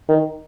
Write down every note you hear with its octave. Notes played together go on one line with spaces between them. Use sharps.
D#3